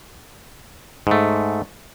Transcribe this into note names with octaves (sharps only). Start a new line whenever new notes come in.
G#2 A3